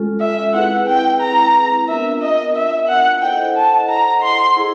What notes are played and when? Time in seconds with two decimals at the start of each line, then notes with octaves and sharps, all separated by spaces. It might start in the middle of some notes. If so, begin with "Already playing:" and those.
Already playing: G#3 C#4 F4 A4
0.20 E5
0.53 C4 E4 G#4 B4 F#5
0.87 G5
1.21 A#5
1.87 B3 D4 F4 A#4 E5
2.21 D#5
2.56 E5
2.88 F#5
3.22 E4 A4 C5 D#5 F#5 G5
3.56 A5
3.89 A#5
4.22 C6
4.57 E4 G#4